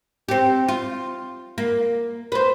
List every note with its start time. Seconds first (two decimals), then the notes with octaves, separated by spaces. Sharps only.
0.28 C4 G4
0.68 F4
1.58 A#3
2.32 B4 C5